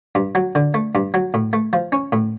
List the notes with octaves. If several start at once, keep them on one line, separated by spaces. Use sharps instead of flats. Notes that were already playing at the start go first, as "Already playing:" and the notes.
G2
F#3
D3
A3
G2
F#3
A2
A3
F3
C#4
A2